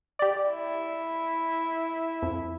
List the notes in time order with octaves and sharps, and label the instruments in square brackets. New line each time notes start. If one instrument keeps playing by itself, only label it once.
[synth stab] G4 D5
[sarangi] E4
[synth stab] F2